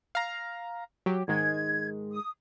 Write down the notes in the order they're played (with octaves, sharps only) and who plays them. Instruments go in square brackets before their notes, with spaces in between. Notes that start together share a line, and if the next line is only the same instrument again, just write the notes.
[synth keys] F5 A#5
F#3 G4
[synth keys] G#2 D#3 G#3 [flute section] G#6
[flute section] D#6